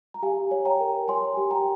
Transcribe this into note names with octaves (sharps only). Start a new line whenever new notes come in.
A#5
G4 F5 G#5
C#5
G5 A#5
A#4
C#5 G#5 C6
G4
G5 A#5